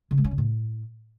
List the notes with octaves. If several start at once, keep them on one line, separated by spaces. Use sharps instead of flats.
C#3
G#3
C#4
C#3
A2